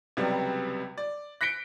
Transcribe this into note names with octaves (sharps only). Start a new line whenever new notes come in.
C#2 C3 F#3 G3 B3
D5
F#6 A#6 B6 C#7 D7 G7